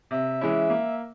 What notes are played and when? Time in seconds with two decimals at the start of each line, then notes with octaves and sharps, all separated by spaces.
0.11 C3 E5
0.41 E3 G#3 C#4 E4
0.70 A#3